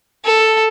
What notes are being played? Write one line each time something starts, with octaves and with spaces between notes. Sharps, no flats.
A4